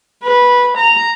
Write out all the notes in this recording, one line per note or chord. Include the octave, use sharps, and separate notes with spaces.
B4
A#5